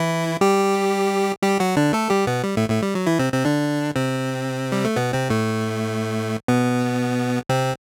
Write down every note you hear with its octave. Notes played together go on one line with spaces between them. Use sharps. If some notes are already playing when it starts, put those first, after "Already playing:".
Already playing: E3 E4
G3 G4
G3 G4
F#3 F#4
D3 D4
A3 A4
G3 G4
B2 B3
G3
A2 A3
A2 A3
G3
F#3
E3 E4
C3 C4
C3 C4
D3 D4
C3 C4
G3
A3
B2 B3
C3 C4
A2 A3
B2 B3
C3 C4